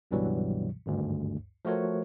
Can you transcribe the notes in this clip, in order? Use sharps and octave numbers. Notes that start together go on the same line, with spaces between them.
C#2 G2 B2 E3 F#3 G3
G#1 D2 G2
F3 A3 F#4 A#4 C#5